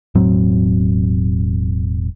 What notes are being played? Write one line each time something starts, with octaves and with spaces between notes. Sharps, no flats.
E1 A2 F#3 C4